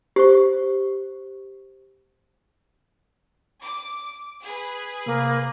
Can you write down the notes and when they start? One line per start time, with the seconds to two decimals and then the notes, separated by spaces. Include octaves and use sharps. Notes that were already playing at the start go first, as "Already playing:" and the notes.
0.16 G4 C5 C#6
3.62 D6
4.43 G#4 B4
5.06 C3 A#3